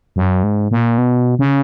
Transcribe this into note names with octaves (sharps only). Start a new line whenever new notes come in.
F#2
G#2
A#2
B2
C#3